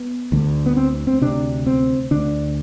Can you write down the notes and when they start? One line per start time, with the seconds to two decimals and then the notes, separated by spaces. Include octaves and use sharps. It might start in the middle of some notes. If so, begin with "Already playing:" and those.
Already playing: B3
0.32 D2 D3
0.66 B3
0.76 C4
1.07 C4
1.21 D2 C3 D4
1.67 C4
2.11 D2 D3 D4